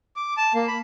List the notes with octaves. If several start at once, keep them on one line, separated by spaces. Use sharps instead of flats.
D6
A5
A#3
B5